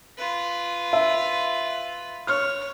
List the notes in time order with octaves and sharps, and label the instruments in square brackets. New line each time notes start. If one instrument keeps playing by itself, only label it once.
[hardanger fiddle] F4 B4
[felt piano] E5
[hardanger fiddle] C#5 [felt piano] F6